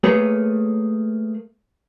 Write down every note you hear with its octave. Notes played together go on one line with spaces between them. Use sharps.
A3 A#3 G#4 B4 C#5